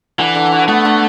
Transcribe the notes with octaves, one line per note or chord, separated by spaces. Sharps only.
D3 E3
D3
F#4
A3 B3
D3